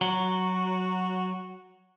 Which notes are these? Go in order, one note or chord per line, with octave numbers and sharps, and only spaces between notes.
F#3 F#4